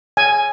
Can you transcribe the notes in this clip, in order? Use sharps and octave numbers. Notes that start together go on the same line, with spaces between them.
G#5